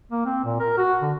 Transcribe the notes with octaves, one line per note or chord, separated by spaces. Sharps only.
A#3
C4
A#2
A#4
F#4
D3